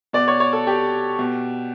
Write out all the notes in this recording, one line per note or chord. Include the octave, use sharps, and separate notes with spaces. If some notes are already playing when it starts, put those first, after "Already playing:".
B2 D5
C#5
C#5
A4
G4
B2